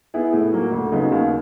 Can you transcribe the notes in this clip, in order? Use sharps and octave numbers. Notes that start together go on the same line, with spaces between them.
B3 E4 G#4
A2
F#3 A#3
D2
C#3 F#3 B3 D#4
D#2